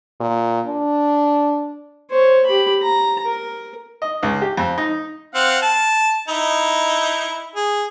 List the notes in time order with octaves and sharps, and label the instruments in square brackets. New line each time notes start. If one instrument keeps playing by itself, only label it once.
[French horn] A#2
D4
[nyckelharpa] C5 C#5
G4 B5
A#5
A#4
[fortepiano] D#5
C#2
G4
F2
D#4
[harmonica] C4 F5 F#5
A5
D#4 E4
G#4